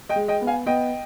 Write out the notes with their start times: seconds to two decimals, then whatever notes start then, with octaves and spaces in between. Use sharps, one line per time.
0.09 D#5 G5
0.15 G#3
0.28 D#5 G5
0.41 B3
0.47 F5 G#5
0.66 B3 D#5 G5